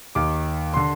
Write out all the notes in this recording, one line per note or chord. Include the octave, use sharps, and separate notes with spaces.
D#2 D#3 D6
D3 C6